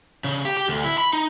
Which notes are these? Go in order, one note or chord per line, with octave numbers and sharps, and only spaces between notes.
C#3
G4
G4
D2
E4
B5
D#4